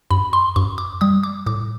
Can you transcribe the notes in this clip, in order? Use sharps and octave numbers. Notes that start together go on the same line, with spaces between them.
F#2 B5
C6
F#2 C#6
D6
G3 D#6
D6
A2 D6